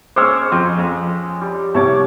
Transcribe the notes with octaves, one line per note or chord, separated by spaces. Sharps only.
G#3 C#4 C5 C#6 D6 E6 F6
F2
F2
G3
C2 A3 C#5 D6